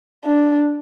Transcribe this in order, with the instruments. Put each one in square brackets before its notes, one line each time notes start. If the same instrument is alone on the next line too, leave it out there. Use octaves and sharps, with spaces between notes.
[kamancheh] D4